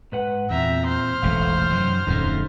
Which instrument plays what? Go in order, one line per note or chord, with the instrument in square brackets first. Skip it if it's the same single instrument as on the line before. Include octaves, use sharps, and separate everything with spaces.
[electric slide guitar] G#2 B4 F#5
[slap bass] E2 [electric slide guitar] A#2 C4 [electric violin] E5 A#5
[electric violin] C5 F6
[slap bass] E1 A1 G#2 [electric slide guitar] B2 A3 F5
[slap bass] F#2 [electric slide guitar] C3 D#3 F#3
[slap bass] D1 F2 A2 [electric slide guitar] C#4 D#4